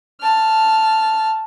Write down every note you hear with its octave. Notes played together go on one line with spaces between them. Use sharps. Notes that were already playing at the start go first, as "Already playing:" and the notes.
A5 F6